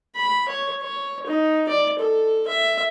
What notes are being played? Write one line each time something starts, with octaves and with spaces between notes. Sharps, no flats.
B5
C#5
C#5
D#4
D5
A4
E5